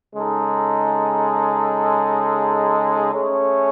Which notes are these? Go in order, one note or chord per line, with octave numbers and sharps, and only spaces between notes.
C#3 G#3 D#4 A4
A3 C#4 G#4